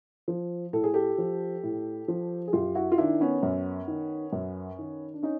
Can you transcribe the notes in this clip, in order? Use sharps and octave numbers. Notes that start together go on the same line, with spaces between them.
F3
A2 A4
G#4
G4 A4
F3
A2
F3
G#4
F#2 F4 G4
E4 F#4
F4
D#3 D4 E4
B3 C#4
F#2
D#3
F#2
D#3
D4
C#4 D#4